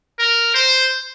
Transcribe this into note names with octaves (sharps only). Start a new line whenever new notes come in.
A#4
C5